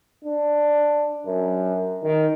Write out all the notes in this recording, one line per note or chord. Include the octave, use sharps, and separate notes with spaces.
D4
F#2
D#3